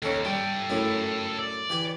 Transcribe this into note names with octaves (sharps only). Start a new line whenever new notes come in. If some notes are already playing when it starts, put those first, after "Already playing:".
D#2 C#4 A4
G3 A4 G5
F#2 A2 E4
D5
E3 G4 G#5